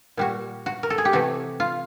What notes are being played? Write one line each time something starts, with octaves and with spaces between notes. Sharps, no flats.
A#2 G3 F#4
F#4
A#4
A4
G#4
G4
C3 E3 A3 F#4
F4